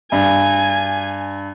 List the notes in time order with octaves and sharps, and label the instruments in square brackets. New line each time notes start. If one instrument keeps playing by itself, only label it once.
[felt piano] G2 [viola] G#5